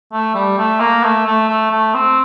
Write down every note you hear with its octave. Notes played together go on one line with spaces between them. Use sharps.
A3
G3
A3
A#3
A3
A3
A3
A3
C4